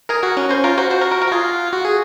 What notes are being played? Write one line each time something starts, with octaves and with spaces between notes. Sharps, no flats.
G#4 A#4
F#4 G#4
C#4 A#4
C#4 C5
F4 A#4
F#4 C5
F#4 C5
A#4
A#4
A#4
F#4
F4 G#4
F#4
G#4